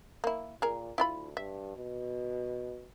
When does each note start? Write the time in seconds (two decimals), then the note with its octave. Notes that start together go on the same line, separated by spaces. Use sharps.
0.24 A#3 E4
0.62 A#2 G#4 A#4
0.98 D2 E4 F4 B5
1.37 G2 E5
1.76 B2